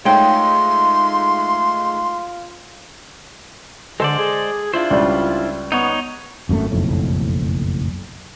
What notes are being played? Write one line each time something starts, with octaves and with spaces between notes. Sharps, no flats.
G#3 A3 D#4 F4 C#5 G5 C6
D3 G#3 A4 C5 D5
G#4
D4 E4 F4 C5
C#2 G3
B3 D#4 C#5
G#1 F#2 C3 A3
F#1 B1 F2 A2